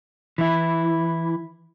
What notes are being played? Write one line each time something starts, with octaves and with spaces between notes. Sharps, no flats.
E3 E4